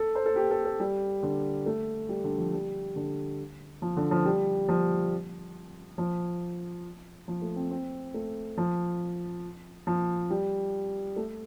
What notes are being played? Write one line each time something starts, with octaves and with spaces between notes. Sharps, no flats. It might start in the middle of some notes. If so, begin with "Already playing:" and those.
Already playing: A4
C5
A4
G4
A4
A4
G3
D3
A3
G3
D3
F3
G3
D3
F3
D3
F3
G3
F3
F3
F3
A3
C4
C4
A3
F3
F3
G3
A3